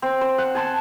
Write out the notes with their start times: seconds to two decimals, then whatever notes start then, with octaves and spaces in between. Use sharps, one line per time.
0.02 C4
0.21 C5
0.38 F#5
0.55 G#5 A5 C6